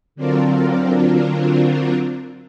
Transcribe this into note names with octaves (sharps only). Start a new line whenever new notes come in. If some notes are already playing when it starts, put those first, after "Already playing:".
D3 F#3 C4 D4 F4 A#4